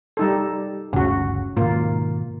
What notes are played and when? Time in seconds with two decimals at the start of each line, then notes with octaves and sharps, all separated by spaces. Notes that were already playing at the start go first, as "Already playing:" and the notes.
0.17 G3 D#4 A4
0.93 G1 D2 C#3 F#4
1.57 G#2 B2 D#3 A#3 F4